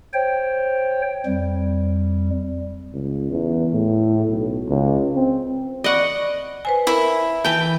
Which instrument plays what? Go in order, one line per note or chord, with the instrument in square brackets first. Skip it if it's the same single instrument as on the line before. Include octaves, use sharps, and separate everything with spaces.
[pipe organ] C5 C#5 G5
F2 G3
[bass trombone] C#2
E2
A2
B1
C#2
C4
[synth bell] D5 [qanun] D#5 F#5 [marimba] B5 C#6
[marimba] B4 C5 G#5
[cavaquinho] E4 [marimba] A#4
[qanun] E3 G5 [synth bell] A5 B5 G6